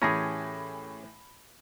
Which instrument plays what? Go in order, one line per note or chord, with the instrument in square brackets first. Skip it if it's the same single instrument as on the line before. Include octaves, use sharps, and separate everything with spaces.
[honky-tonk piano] A2 E3 [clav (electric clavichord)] C#4 G4 G#4 [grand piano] A5 B5 A#6